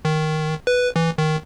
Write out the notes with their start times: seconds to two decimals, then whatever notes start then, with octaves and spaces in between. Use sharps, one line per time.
0.05 D#3
0.67 B4
0.96 E3
1.18 D#3